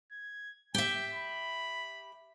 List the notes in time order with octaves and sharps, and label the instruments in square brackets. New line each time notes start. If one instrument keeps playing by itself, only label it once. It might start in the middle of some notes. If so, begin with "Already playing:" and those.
[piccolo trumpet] G#6
[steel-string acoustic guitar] G4 E5 [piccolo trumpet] G5
[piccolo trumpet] B5